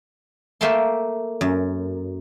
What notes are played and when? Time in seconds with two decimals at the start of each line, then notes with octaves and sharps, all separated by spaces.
0.61 A3 A#3 E5 G5 A5 C6
1.41 F#2